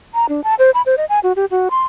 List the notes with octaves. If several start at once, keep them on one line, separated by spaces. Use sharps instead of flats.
A#5
D4
A5
C5
B5
C5
D#5
G#5
F#4
G4
F#4
C6